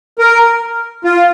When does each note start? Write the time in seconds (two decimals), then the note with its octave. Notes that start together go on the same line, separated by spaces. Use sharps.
0.19 A#4
1.04 F4